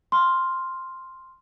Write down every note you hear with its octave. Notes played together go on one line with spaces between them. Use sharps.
C6 F6